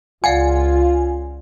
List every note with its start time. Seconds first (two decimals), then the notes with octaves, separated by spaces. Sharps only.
0.24 C#2 F4 D5 F5 F#5 G#5